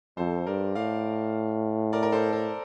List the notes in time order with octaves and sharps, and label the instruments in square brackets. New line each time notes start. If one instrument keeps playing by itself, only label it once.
[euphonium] F2 [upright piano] A4 C5
[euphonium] G2 [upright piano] A#4 D5
[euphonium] A2 [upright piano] D5 F5
[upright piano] A#4 D5
A#4
A4 C5
A4